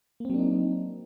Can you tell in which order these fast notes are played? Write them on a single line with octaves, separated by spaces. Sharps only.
A#3 C4 F#3 D4 D#4